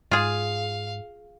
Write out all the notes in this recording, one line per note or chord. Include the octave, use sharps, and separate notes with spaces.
G#2 F4 G#4 F5